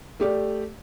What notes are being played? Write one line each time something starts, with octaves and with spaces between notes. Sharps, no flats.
A3 G4 D5